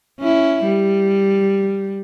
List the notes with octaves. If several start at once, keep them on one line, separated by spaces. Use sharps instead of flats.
C#4 E4
G3